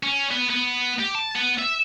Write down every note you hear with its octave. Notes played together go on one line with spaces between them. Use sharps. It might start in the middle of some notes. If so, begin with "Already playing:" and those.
C#4
B3
B3
G4
A5
B3
E5